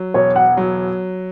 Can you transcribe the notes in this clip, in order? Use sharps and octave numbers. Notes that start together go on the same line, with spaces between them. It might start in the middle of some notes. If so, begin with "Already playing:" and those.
Already playing: F#3
E1 C#5
F#5
F#3